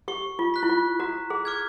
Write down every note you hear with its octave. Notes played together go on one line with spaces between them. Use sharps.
G4 C#6
F4
F#6 B6
E4
F4
F#4 A#5
G#4
D6 F6 G#6